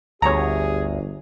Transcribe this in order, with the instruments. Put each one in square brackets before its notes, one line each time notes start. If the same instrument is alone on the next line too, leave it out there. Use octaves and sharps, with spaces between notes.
[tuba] G1 [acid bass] D2 [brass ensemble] G4 G#4 [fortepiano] C#5 A#5